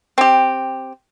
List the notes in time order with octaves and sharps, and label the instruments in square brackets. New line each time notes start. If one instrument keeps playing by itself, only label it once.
[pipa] C4 G4